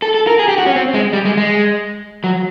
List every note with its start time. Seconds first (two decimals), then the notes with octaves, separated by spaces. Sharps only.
0.02 A4
0.14 A4
0.27 A#4
0.39 G#4
0.48 G4
0.58 F#4
0.66 C#4
0.76 C4
0.94 G#3
1.13 G3
1.25 G#3
1.37 G#3
2.24 F#3